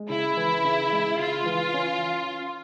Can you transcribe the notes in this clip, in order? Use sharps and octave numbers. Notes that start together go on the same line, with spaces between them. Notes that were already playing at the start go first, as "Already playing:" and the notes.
Already playing: G#3
C#3 E4
E3
C#3
G#3
C#3 F4
E3
C#4